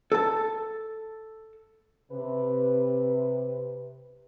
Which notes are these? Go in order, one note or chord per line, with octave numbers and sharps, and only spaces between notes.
A4 A5
C3 B4